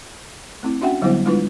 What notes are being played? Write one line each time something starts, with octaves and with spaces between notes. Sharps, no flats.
A3 C4 E4
C#4 D4 F#4 E5 F#5 G5
D3 F#3 G3 B3 E4 C5
G3 G#3 D4 E4 F4 B4